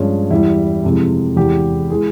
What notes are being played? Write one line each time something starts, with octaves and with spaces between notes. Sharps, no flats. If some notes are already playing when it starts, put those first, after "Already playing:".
Already playing: G2 F3 G#3 C#4
E2 E3 G3 E4
F2 C3 E3 G#3
E2 C3 E3 G#3 G4
E3 G#3 G#4